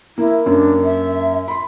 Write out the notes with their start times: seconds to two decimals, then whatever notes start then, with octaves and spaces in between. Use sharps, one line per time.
0.18 A#3 E4
0.46 F#2 A#3 D4
0.84 E5
1.48 B5 C6